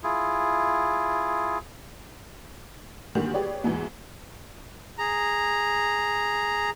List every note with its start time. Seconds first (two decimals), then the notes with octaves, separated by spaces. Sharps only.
0.03 E4 F4 G#4
3.15 D2 G2 A#2 D3 D#3 A#3
3.34 G4 G#4 B4 C#5 D5
3.64 E2 G#2 B2 E3
4.98 G#4 A#5